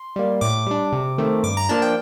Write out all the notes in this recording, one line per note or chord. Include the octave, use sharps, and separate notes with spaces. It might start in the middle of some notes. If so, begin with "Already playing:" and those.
Already playing: C6
G3 A#3
A2 D6
G3 D4
C3
D#3 A3 C4
G2 D6
A#5
F3 A#3 D4 A5
G5